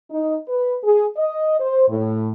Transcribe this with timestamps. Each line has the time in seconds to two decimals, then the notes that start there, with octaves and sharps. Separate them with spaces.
0.11 D#4
0.48 B4
0.84 G#4
1.17 D#5
1.60 C5
1.89 A2